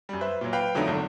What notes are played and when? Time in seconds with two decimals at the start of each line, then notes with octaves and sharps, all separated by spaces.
0.09 F#2 G3
0.21 B4 C5 E5
0.41 A#2 F#3
0.53 B4 F5 G5 B5
0.75 F2 D3 F#3 A3 D4 D#4
0.88 G#1 D3